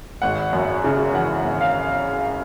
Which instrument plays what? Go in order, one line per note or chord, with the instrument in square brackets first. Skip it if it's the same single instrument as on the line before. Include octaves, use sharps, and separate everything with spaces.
[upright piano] G#1 F#5
F#2
C#3
E3 F#5
G#1
F5